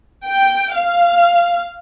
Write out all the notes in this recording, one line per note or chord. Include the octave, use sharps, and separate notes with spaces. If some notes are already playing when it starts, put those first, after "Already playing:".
G5
F5